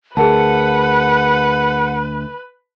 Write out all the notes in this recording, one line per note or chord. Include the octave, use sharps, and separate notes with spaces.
D2 G#4 A#4 B4 F#5 A5